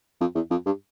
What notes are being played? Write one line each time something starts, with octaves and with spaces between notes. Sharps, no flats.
F2
E2
F2
G2